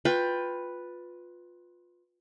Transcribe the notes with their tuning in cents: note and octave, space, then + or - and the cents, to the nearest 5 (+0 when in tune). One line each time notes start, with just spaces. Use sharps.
F4 +20 B4 +0 G5 +15